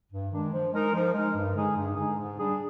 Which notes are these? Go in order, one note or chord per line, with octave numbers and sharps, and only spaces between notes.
G2
D#3 G#3 D4
F3
G#3 D#4 A#4
F3
G#3 D#4 A#4
G2
D3 G#3 D#4 G#4
G2
D3 G#3 D#4 G#4
G#2
G3 D4 G#4